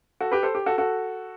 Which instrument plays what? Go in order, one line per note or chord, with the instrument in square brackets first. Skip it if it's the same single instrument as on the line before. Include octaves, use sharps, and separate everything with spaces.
[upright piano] F#4 A4
G4 B4
A4 C5
G4
F#4 A4
F#4 A4